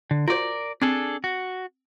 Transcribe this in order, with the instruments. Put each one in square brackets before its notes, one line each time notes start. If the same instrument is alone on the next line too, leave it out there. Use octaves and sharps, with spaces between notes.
[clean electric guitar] D3
[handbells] F4 F#4 C5 [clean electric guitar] A#4 D5
[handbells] C4 [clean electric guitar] D4 G#4 A4
[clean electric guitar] F#4